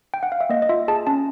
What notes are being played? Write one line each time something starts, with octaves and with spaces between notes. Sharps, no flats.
G5
F#5
F5
E5
A#3 D#5
D#5
F4 E5
G#4 A5
C#4 A5